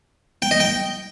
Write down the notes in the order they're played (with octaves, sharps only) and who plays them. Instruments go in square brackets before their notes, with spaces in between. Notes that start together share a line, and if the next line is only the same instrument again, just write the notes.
[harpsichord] G5
D#5
G5